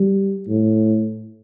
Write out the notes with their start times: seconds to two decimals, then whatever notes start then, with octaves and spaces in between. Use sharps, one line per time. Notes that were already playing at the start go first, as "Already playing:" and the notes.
Already playing: G3
0.48 A2